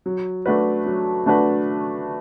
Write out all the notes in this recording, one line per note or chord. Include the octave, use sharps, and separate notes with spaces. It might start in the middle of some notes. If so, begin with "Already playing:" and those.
F#3
A3 D4 F#4 B4
F#3
A3 D4 F#4 B4